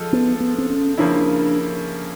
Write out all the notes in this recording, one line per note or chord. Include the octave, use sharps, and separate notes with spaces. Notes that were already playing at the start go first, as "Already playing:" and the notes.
Already playing: F3 G#3 F4 A4
B3
B3
C4
C#4
C#3 F3 A#3 C#4 D4 E4